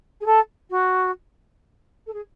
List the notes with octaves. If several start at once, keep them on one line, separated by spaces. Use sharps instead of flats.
G#4
A4
F#4
A4
G#4